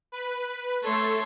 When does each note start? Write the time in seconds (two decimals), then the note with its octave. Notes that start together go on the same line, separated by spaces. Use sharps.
0.12 B4
0.83 A3 A4 C#5 C6